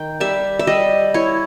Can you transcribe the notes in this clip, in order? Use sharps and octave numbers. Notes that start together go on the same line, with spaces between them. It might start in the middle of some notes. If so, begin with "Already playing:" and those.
Already playing: D#3 G5
G3 E5
E5
G3 D#5
E4 C#5